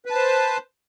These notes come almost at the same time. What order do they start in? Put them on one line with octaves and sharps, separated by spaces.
B4 A5 C5